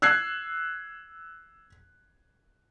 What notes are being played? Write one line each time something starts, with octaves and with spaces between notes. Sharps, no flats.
E6 F#6 G#6 C7